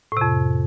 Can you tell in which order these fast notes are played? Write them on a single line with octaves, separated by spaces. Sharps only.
A2 C3 F2